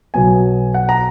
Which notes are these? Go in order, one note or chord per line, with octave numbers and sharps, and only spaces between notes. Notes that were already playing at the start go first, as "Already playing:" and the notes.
B1 B2 F#3 B3 G#5
F#5
A#5